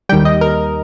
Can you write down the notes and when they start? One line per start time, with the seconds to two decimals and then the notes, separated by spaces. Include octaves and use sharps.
0.09 G3 G5
0.12 D#2 D#3
0.25 D#5
0.41 A#4